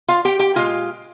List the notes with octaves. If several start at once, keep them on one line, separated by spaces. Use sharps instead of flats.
F4 F5
G4 G5
G4 G5
A#2 G#3 F4 F5